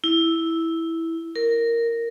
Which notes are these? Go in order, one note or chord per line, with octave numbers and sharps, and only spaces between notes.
E4
A#4